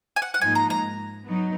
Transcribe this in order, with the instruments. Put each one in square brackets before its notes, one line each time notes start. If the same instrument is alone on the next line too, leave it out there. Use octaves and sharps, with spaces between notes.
[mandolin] G#5
F#5
F#5
[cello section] G#2 F3 A#3 D#4 [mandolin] G#5
[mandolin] A#5
A#5
[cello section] F#3 B3 D#4